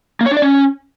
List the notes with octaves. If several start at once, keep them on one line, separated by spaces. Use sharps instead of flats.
A#3
C#5
D4
D5
C#4